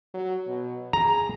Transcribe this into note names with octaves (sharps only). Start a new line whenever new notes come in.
F#3
B2
G#4 A#5